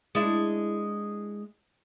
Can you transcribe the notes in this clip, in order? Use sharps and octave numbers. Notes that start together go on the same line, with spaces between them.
G#3 D4 E4